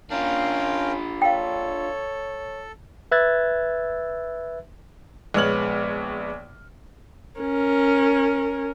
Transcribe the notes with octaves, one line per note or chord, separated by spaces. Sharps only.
C#4 D4 F4 A#4 F5 G5
A4 C#5 F5 G5
B4 E5 E6 F#6 G#6 A6
A#1 G#3 B3 C#5 F6 F#7
C#4 A#4